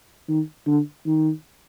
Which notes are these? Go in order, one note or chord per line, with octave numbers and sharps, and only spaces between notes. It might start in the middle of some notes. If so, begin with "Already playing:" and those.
D#3
D3
D#3